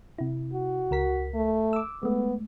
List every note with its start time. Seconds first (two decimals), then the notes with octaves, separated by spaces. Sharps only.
0.18 C3 E4
0.53 F#4
0.91 C#2 A#4 B6
1.34 A3
1.73 D6 E6
2.03 G#3 A3 B3